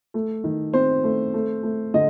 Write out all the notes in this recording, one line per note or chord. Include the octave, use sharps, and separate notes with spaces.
A3
D#3
C4 C5
A3
A3
A3
D3 D#5